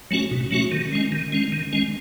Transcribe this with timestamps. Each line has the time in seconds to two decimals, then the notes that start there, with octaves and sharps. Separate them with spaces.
0.11 F#3 A3 C#4 F#4
0.31 B2
0.51 F#3 A3 C#4 F#4
0.72 D#3
0.92 G#3 C#4
1.12 D#3
1.32 G#3 C#4
1.52 D#3
1.73 G#3 C#4